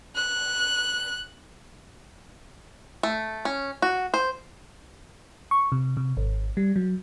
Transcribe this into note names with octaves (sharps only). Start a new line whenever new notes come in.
F#6
A3
C#4
F#4
C5
C#6
C3
C3
G#1
G3
F#3